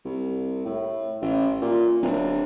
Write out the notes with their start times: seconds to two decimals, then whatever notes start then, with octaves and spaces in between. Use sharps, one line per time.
0.05 C2
0.65 A2
1.22 A1
1.62 A#2
2.02 D1